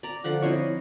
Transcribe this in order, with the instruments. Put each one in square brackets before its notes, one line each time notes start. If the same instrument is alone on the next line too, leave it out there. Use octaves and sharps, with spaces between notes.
[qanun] D5 A#5
D3 F3 F#5
[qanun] F3 D#5 [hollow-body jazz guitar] C4 E4 C#5